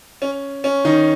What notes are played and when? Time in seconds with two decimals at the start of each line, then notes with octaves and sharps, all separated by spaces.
0.22 C#4
0.64 C#4
0.85 D#3 D#4